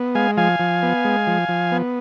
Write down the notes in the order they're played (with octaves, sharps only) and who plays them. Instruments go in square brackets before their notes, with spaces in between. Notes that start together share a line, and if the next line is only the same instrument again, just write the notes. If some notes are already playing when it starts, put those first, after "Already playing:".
Already playing: [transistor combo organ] B3
G#3 F5 G#5
F3 F5 G#5
F3
B3
G#3
F3
F3
B3